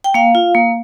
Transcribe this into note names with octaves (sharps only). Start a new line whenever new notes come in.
G5
A#3 F5
F4
A#3